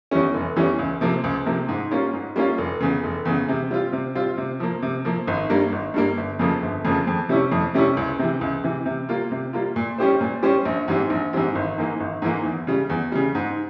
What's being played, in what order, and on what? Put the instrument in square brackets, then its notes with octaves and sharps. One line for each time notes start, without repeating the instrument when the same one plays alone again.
[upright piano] E2 E3 G3 C#4
F1
E2 E3 G3 C#4
C#2
C3 F3 A#3
C#2
C3 F3 A#3
G#2
G3 A#3 C#4 F4
G#2
G3 A#3 C#4 F4
F1
E2 C#3
F1
E2 C#3
C3
G3 C4 F4
C3
G3 C4 F4
C3
F3 A#3
C3
F3 A#3
G#1
G2 G3 A#3
G#1
G2 G3 A#3
G1
F2 C#3 F3 A#3
G1
F2 C#3 F3 A#3
F2
C3 G3 C#4 E4
F2
C3 G3 C#4 E4
C#2
C3 E3
C#2
C3 E3
C3
G3 A#3 F4
C3
G3 A#3 F4
A#2
G3 C#4 G4 C5
A#2
G3 C#4 G4 C5
A#1
G#2 E3 G3 C4
A#1
G#2 E3 G3 C4
G#1
G#2 E3 A#3
G#1
G#2 E3 A#3
E2
C#3 G3
E2
C#3 G3
G#2